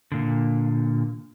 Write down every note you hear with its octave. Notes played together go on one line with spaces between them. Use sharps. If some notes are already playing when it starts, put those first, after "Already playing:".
A#2 D3